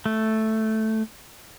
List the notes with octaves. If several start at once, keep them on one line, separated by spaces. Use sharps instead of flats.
A3